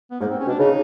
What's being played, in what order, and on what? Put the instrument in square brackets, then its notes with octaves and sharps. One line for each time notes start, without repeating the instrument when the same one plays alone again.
[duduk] B3
[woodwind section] G#2 [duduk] A#3
[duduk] C4
C#4
[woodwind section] B2
[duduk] D4
[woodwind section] C#3 [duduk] D#4